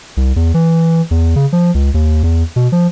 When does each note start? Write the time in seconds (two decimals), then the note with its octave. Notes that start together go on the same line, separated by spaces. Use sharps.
0.17 C2
0.36 E2
0.54 E3
1.11 E2
1.36 C#3
1.52 F3
1.74 C#2
1.94 D#2
2.23 E2
2.56 B2
2.72 F3